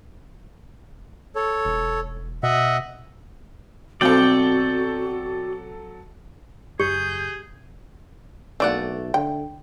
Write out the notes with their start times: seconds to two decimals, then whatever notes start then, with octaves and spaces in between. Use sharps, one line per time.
1.35 A4 C#5
1.65 E1
2.43 B2 D#5 E5 F#5
4.01 B2 F#3 C4 F#4 A4 D5 F5 G5
6.80 F#1 F#2 G4 G#4 G6
8.60 B1 D3 A3 A#3 D5 F#5
9.14 D3 G5